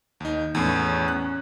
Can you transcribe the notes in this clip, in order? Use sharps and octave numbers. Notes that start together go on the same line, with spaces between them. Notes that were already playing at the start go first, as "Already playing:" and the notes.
D#2 D#4
E2 A2 C#4
F#6